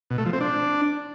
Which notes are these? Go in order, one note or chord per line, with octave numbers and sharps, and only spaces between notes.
B2
A3
F3
C4
D4